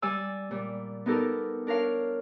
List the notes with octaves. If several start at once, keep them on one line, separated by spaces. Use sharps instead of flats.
G3 D5 G#5 E6
A#2 G3
B3 D#4 G4 A4 A#4
D4 A#4 C#5 F5